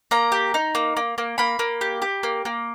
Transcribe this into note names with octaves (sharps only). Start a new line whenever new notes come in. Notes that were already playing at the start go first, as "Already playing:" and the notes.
A#3 A#5
G4
D#4
A#3
A#3
A#3
A#3 B5
A#3
G4
G4
A#3
A#3